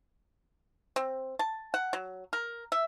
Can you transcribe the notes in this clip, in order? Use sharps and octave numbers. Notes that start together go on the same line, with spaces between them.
C4
A5
F#5
F#3
A#4
E5